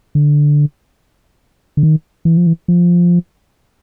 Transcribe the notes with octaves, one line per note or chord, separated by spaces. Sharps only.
D3
D3
D#3
E3
F3
E3
F3